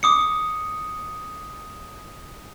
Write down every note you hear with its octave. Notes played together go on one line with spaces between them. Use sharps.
D6 D#6 C#7